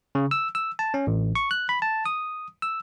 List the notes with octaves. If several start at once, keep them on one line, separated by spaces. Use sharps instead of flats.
C#3
E6
E6
A5
C#4
A1
C#6
F#6
B5
A5
D#6
E6